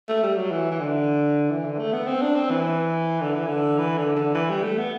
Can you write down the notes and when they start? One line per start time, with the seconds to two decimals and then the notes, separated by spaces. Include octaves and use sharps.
0.09 A3
0.23 G3
0.37 F#3
0.51 E3
0.71 E3
0.80 D3
1.50 E3
1.65 D3
1.79 A3
1.93 B3
2.07 C4
2.22 D4
2.35 C4
2.50 E3
3.21 D3
3.34 E3
3.47 D3
3.78 E3
3.98 D3
4.16 D3
4.35 E3
4.50 G3
4.63 A3
4.78 B3